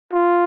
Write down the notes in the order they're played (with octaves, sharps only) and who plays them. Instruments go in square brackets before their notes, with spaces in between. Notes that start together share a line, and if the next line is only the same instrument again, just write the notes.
[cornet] F4